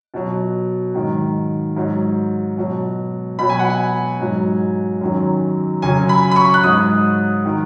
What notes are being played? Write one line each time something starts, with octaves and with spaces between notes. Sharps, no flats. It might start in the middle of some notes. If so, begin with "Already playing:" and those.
B2 F#3
G#2 D#3 F#3
G#2 F#3
B2 F#3
B2 F#3 B5
G#5
F#5
G#5
G#2 F#3
F#2 D#3 F#3
F#2 C#3 F#3 G#5
B5
B5
C#6
F#6
G#2 F#3 D#6
D#3 F#3